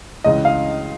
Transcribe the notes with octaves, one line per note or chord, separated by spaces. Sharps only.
C#2 C#3 E3 D#5
F5